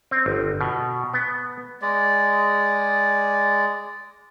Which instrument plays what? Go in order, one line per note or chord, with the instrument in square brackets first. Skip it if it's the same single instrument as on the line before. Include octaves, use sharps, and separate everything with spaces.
[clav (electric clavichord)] C4
G1
B2
B3
[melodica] G#3 D5